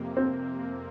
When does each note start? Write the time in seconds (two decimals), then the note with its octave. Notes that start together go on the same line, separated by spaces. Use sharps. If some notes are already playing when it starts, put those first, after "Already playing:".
Already playing: F2 C3 A#3
0.17 C4